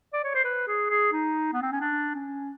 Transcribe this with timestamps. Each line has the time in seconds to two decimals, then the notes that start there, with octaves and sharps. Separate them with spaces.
0.13 D5
0.24 C#5
0.34 C5
0.45 B4
0.68 G#4
0.90 G#4
1.12 D#4
1.53 B3
1.62 C4
1.72 C#4
1.81 D4
2.14 C#4